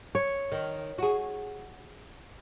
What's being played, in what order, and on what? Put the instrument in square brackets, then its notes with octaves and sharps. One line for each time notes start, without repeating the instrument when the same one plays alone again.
[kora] C#5
[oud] D#3
F#4 G#4